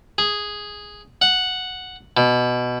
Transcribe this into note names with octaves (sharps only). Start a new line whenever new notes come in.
G#4
F#5
B2